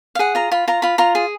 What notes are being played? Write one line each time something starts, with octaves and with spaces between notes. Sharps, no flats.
F5
G#4 F#5
F4 A#5
F4 B5
F4 A#5
F4 B5
F4 A#5
G#4